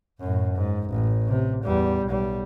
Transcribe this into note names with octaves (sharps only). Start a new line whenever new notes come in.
F#2 A2
G#2
A1
C3
E2 G3
B1 G3